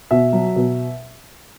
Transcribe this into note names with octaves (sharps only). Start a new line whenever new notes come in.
B2 E5
F#3
B2